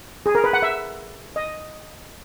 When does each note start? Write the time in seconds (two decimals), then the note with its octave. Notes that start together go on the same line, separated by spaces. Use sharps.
0.26 G#4
0.35 A#4
0.44 B4
0.53 F#5
0.63 E5
1.36 D#5